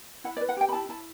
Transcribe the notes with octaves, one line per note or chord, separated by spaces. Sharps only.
E4 F#5
D5
B4
F#5
G4 G5
B5
E4 A5
E4 A5